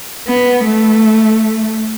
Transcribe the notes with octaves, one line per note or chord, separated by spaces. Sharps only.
B3
A3